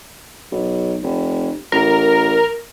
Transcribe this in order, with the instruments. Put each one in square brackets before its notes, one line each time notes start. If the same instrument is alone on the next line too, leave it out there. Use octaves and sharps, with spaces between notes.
[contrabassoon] B1
F1
[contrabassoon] A1 [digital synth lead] A#4